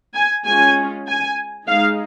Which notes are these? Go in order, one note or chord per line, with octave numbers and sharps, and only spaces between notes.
G#5
G#3 C#4 F4 G#5
G#5
G#3 D#4 F5